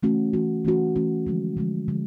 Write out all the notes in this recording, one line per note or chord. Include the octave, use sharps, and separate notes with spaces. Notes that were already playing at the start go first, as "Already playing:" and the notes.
E3 A3 C#4 F#4
E3 A3 C#4 F#4
E3 A3 C#4 F#4
E3 A3 C#4 F#4
D3 F3 G#3
D3 F3 G#3
D3 F3 G#3